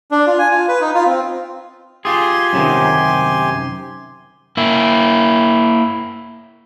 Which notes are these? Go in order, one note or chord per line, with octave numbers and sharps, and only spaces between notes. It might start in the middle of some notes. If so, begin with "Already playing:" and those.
D4
F4
G#5
F4
B4
D#4
F4
C4
F4 G4 G#4 G#5 C6
F#2 C3 D#3
A#3 E4